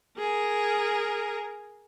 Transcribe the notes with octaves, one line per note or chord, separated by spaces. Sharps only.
G#4 A#4